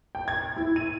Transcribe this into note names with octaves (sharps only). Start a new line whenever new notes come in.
G5
G#6
E4
D#7